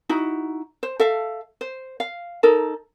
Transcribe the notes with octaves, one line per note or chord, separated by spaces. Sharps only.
D#4 E4 F#4
C5
A4 E5 F5
C5
F5
D#4 A4 A#4